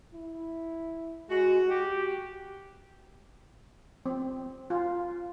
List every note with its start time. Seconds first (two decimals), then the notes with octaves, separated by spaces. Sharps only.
0.14 E4
1.29 G#3 F#4
1.69 G4
4.06 C4
4.70 F4